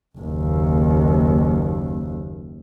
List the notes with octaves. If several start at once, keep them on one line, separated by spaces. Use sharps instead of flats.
F#1 D#2